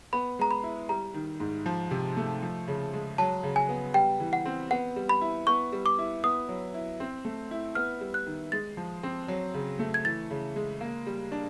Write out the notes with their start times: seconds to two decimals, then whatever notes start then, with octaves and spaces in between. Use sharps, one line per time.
0.13 B3 B5
0.39 G#3 A#5
0.51 B5
0.63 E4
0.89 G3 A#5
1.14 D#3
1.40 G#2
1.66 F3
1.91 C3
2.17 A3
2.43 F3
2.68 C#3
2.93 G#3
3.18 F#3 A5
3.43 C#3
3.56 G#5
3.69 B3
3.94 G3 G5
4.20 E3
4.33 F#5
4.45 C4
4.71 B3 F#5
4.96 G3
5.09 B5
5.21 E4
5.47 B3 C#6
5.72 G3
5.86 D6
5.99 E4
6.24 B3 D#6
6.49 F#3
6.74 E4
7.00 C4
7.25 A3
7.51 E4
7.75 B3 F6
8.01 G3
8.14 F#6
8.27 D#3
8.52 G#3 A6
8.77 F3
9.03 C4
9.28 F#3
9.54 C#3
9.79 A3
9.94 G#6
10.05 E3 A6
10.30 C#3
10.56 G#3
10.81 A#3
11.06 G3
11.32 D4